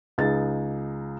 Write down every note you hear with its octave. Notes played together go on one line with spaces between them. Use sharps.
C#2 D#4 G#4 A6